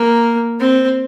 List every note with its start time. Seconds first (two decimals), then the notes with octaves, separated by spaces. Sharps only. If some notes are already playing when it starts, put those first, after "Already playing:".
Already playing: A#3
0.60 C4